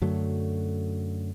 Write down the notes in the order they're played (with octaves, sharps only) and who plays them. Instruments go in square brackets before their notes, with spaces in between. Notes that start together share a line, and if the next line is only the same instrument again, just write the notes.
[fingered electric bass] F#2 D3 F#3 A3